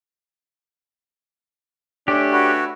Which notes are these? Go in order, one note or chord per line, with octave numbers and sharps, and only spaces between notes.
A3 C#4 D4 G4
F#4 B4 C#5